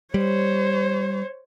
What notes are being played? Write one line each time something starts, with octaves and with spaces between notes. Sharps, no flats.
G3 C5 C#5